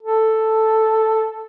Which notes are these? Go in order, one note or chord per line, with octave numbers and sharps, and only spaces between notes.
A4